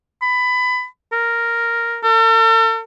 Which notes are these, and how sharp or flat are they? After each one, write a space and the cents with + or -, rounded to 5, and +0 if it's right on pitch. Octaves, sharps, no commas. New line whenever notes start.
B5 +20
A#4 +0
A4 +45